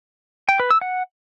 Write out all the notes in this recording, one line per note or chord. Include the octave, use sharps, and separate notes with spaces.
G5
B4
E6
F#5